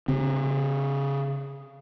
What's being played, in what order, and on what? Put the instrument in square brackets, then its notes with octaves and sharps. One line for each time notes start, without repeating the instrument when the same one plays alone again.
[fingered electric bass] C#3 C4